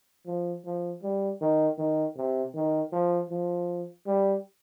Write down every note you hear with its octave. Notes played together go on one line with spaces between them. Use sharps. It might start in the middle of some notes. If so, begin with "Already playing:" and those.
F3
F3
G3
D#3
D#3
C3
D#3
F3
F3
G3